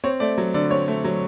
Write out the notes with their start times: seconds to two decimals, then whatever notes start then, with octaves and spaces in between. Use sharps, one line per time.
0.04 C4 C#5
0.20 A3 D5
0.38 F#3
0.54 D3 D5
0.71 C4 C#5
0.88 A3
1.04 F#3